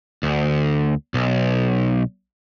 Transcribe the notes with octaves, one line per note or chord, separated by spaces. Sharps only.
D2
B1